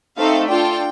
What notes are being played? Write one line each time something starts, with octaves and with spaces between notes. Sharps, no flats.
A3 C4 D#4 A4 F5
D4 F4 A4 G5